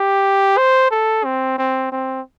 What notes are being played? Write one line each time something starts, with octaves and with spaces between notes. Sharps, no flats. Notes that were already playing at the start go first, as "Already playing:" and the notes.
Already playing: G4
C5
A4
C4
C4
C4